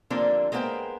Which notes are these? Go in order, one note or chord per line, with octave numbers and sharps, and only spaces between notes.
D3 F3 G3 A#3 C4 D4
G#3 A#3 B3 A4 C5 G5